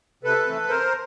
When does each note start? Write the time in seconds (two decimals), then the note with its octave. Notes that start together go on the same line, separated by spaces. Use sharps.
0.23 C3 A4 B4
0.46 E3 A3 C4
0.69 C3 A#4 C5